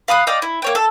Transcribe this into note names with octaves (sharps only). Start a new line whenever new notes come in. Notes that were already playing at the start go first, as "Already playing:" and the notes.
F5 B5 D#6 F#6
D5 D#5 F5 G5
E4
A#3 C#5 G5
A4